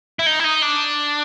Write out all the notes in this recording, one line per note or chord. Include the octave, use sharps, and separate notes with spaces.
E4
D#4
E4
D#4
D4